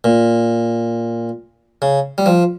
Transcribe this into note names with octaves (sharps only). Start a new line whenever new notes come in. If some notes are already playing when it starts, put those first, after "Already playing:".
A#2
C#3
G3
F3